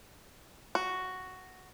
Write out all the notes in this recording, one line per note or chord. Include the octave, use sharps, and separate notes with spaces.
F#4